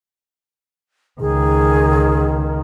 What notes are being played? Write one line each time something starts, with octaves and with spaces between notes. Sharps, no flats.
C#2 D#3 G#4